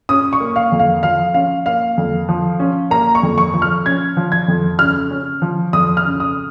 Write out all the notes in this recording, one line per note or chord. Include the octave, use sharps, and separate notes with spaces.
C#4 D#6
C#6
A#3
F5
F2
F5
F3 F5
C#4 F5
A#3 F5
F2
F3
C#4
A#3 A#5
C#6
F2
C#6
F3
F6
C#4 G#6
F3
G#6
F2
C#3 F6
C#4
F3
F2 D#6
F6
C#3
D#6